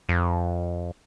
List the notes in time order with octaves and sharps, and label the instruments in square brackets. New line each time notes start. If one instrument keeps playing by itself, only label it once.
[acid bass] F2